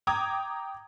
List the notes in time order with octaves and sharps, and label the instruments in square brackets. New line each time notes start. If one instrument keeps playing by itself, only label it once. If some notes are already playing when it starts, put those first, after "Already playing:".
[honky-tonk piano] G5 A#5 D6 D#6 G#6